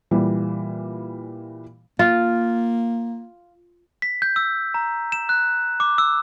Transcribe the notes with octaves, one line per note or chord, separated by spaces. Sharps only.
A#2 E3 G3
A#3 F4
B6
G6
E6
A#5
E7
F#6
D6
E6